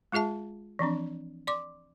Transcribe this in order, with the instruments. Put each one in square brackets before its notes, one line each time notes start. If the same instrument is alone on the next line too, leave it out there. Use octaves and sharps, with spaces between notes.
[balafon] G#3 F4 G#4 E5 A5
E3 F3 C4 D4
D5 C6 D6